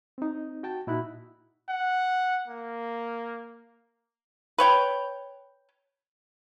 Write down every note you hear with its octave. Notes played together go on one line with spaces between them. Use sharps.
C4 D#4
F#4 G5 A5
A#2 D#4 E4 F#4 B5 F#6
F#5
A#3
B4 C#5 G5